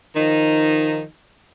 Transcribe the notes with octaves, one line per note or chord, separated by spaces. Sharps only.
D#3 F3 D#4